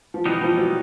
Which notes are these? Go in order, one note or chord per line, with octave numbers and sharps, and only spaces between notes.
F3
B2 E3 G3 B3 D#4
F3
F#3